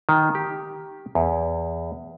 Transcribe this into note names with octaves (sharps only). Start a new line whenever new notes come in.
D#3
G4
E2